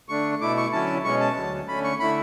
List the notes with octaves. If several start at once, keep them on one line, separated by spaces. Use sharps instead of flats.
D3 A3 D4 C#6
B2 A3 E4 D6
C#6
D3 F#3 C#4 E4 A5
B2 G#3 C#4 C#6
A5
D2 D3 F#3
D3 A3 C#4 B5
C#6
D3 A3 E4 B5